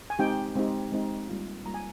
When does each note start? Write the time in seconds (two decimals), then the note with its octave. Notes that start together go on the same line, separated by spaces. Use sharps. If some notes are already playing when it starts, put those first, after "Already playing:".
0.10 G#5
0.19 G#3 C4 D#4 G4 G5
0.55 G#3 C4 D#4 G4
0.92 G#3 C4 D#4 G4
1.29 G3 A#3 F4
1.65 G3 A#3 F4 A#5
1.74 G#5